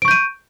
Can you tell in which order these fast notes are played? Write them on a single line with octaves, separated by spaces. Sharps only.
D7 C#6 G6 D#7